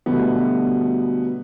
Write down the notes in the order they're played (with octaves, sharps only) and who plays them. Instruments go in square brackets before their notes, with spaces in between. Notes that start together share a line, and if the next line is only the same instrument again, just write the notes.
[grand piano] B2 D3 F#3 G3 A3 B3